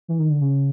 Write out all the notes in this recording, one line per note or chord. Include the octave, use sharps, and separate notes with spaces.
E3
D#3
D3
C#3